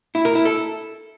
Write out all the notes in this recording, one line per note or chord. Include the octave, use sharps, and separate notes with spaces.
E4
A#4
E4
A4